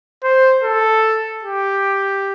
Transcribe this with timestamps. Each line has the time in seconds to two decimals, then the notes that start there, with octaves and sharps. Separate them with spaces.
0.24 C5
0.63 A4
1.43 G4